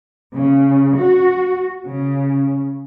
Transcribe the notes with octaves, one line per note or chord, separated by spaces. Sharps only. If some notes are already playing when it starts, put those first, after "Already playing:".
C#3
F#4
C#3